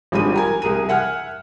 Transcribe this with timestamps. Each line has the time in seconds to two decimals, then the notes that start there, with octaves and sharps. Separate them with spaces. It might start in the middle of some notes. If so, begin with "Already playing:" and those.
0.12 G#1 F3 G3 D4 G#4 D#7
0.34 G4 A#4 G#5
0.62 C2 G#4 A#4 D#7
0.89 E5 F#5 G#5 F6